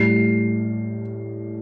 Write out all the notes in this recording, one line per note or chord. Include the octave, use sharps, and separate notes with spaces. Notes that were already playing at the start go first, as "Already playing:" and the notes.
Already playing: A2 G3 C7